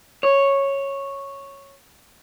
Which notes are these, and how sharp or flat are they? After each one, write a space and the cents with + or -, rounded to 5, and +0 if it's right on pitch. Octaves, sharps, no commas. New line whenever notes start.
C#5 -5